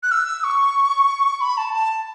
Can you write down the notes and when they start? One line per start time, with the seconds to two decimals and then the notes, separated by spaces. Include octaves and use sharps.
0.03 F#6
0.11 E6
0.44 C#6
1.41 B5
1.57 A5
1.74 A5